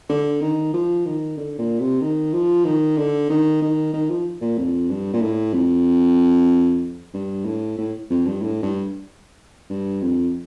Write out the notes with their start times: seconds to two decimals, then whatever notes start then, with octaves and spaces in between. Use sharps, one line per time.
0.09 D3
0.41 D#3
0.73 F3
1.06 D#3
1.37 D3
1.58 A#2
1.80 C3
2.01 D#3
2.33 F3
2.65 D#3
2.97 D3
3.30 D#3
3.62 D#3
3.94 D#3
4.10 F3
4.41 A#2
4.58 F2
4.90 G2
5.13 A#2
5.21 A2
5.54 F2
7.14 G2
7.46 A2
7.78 A2
8.10 F2
8.26 G2
8.42 A2
8.63 G2
9.70 G2
10.02 F2